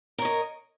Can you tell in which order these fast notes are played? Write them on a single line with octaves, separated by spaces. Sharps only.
A#4 C#5 D#5